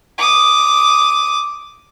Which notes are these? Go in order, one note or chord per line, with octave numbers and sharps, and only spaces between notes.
D6 D#6